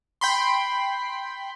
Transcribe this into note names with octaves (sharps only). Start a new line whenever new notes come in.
G5 B5 C6